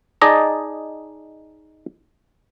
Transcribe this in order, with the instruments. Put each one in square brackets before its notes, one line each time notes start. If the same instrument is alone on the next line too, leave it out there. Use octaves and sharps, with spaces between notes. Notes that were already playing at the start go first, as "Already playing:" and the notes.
[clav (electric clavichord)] D#4 G#4 D5 D#5 A5 A#5